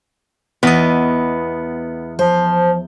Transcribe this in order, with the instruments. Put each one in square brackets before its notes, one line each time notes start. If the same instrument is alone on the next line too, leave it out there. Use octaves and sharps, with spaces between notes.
[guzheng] E2 D#5 [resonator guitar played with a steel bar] B3
[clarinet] F3 [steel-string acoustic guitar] C5